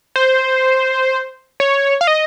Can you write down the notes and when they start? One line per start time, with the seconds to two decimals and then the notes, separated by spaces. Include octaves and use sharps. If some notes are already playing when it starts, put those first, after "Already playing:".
0.16 C5
1.60 C#5
2.01 F5
2.07 D#5